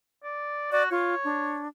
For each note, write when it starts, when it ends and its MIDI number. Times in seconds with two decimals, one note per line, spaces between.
0.24 0.72 74
0.72 0.90 66
0.72 0.83 74
0.91 1.15 65
0.91 1.59 73
1.24 1.68 62